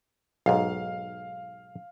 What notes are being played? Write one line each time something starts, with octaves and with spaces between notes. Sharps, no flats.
B1 G#2 F5